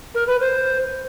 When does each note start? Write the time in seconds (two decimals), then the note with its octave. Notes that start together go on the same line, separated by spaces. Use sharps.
0.15 A#4
0.27 B4
0.40 C5